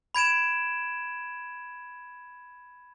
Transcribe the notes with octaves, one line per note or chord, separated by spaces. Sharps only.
B5 G#6 D7 E7